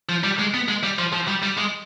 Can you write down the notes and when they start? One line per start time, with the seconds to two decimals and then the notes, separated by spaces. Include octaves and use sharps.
0.09 F3
0.24 G3
0.39 G#3
0.54 B3
0.68 G#3
0.83 G3
0.99 F3
1.13 F3
1.28 G3
1.43 G3
1.58 G#3